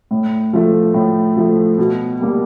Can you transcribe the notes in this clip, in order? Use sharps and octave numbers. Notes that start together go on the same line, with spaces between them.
A2
F3 A3
A2
F3 A3
B2
G3 A#3